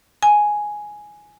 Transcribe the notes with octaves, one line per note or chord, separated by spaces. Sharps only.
G#5